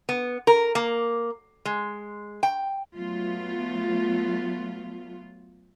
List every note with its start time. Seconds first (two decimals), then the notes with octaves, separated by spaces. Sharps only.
0.09 B3
0.47 A#4
0.75 A#3
1.65 G#3
2.43 G5
2.97 F#3 A3 B3 F4